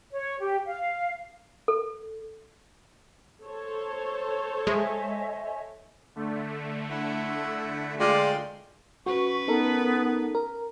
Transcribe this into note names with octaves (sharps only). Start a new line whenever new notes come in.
C#5
G4
F5
A4
A4 C5 C#5
G#3 D#5 E5 G#5
D3 A3
E4 E5 F#5
G#3 F4 D5 F5 G5 C6
C#4 F#4 B4 C#6
B3 D#4 A4 A#4
A#4